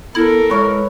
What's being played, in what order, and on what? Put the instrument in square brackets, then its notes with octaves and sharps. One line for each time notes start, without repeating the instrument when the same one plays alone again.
[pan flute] B3 [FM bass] E4 [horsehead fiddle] A4 A#4
[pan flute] G#3 [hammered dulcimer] B4 C#5 E5